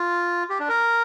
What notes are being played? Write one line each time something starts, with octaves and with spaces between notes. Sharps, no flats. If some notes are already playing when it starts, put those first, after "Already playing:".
Already playing: F4
G4
D4
A#4